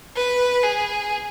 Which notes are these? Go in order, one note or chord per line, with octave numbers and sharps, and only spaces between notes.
B4
G#4